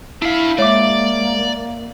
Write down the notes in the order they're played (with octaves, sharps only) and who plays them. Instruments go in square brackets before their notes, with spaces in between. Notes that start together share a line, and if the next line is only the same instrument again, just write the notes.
[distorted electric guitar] D4 B5 [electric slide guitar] E4 F5
[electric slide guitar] G#3 [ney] A#3 [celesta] C#5 E5 D6 [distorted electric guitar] D5